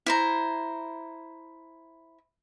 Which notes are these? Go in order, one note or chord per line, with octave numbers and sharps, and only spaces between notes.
E4 C5 A#5